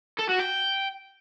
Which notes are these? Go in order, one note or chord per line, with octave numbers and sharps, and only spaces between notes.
A4
F#4
G5